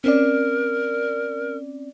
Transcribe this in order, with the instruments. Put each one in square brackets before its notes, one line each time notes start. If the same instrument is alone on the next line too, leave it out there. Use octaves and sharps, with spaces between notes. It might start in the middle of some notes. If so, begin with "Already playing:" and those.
[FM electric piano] C4 C#4 D5 [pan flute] A#4